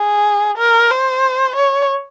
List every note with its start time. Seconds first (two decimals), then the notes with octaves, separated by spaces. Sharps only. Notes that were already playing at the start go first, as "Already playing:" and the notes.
Already playing: G#4
0.58 A#4
0.91 C5
1.56 C#5